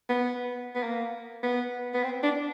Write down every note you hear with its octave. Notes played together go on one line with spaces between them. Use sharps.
B3
B3
A#3
B3
B3
C4
D4